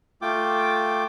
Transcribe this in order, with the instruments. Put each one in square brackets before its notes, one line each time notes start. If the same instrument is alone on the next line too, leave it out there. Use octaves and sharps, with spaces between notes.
[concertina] A3 F4 G5 D6